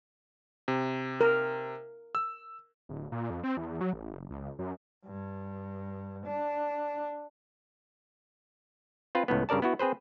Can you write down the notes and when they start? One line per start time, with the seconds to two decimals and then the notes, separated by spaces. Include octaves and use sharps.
0.68 C3
1.21 A#4
2.15 E6
2.89 D1
3.12 A#2
3.30 F2
3.44 C4
3.57 E2
3.81 F#3
3.93 A1
4.12 F#1
4.30 C#2
4.59 F#2
5.06 G2
6.27 D4
9.15 C4 F4 B4
9.28 C#2 A2 B3
9.49 G2 C#3 A#4 D5 A5
9.62 B3 E4 F#4
9.79 C4 G#4 B4 C5